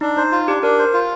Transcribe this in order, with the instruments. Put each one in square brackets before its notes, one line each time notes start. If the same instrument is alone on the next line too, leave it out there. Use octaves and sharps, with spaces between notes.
[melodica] D4 [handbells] D#4
[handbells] D#4 [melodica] C5
[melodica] F4
[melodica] D4 [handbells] G4
[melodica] D4 [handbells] A#4
[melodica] C5
F4